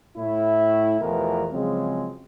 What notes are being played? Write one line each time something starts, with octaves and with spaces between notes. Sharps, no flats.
A2 E4
E2 B2 E3 F3 A3 A#4
C#3 F3 F#3 G#3 C4